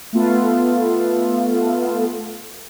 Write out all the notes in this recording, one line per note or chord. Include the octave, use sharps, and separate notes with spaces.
A3 B3 F4 A4